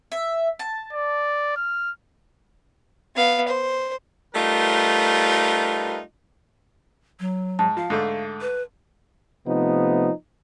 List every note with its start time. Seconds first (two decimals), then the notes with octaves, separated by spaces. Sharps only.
0.12 E5
0.59 A5
0.93 D5
1.57 F6
3.16 B3 F5
3.48 C5
4.35 G3 A3 D#4 F4 A#4 B4
7.20 F#3
7.59 G#2 A5
7.77 F3 F5
7.90 G#2 D3 A3
8.41 B4
9.47 C3 F3 A3 B3 D#4